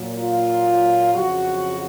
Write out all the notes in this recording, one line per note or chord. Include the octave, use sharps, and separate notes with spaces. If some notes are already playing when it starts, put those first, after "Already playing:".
Already playing: A#2 F#3
F4
F2 C#3 F#3 F#4